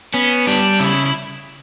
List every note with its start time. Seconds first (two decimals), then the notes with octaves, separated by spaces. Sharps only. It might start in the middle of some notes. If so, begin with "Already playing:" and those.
0.14 B3 C#4
0.47 G3 D4
0.79 C#3 E4
1.06 E4